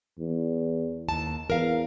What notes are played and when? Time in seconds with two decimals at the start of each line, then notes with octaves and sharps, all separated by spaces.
0.19 E2
1.09 D#2 A5
1.50 E2 A#4 F5